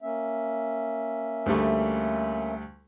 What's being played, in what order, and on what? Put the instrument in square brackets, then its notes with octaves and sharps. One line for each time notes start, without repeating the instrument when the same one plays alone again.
[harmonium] A#3 C#4 E5
[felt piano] D2 G3 A3